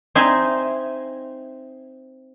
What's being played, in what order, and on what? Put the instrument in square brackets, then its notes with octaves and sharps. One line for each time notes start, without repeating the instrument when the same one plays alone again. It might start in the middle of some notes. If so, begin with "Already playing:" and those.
[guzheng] C4 D#4 E5 G#5 C6